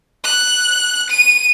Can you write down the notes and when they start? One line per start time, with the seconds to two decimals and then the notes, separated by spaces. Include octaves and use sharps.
0.24 F#6
1.10 D#7